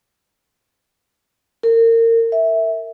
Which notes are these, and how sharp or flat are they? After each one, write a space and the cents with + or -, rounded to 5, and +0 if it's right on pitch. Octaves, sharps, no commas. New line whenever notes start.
A#4 -30
E5 -10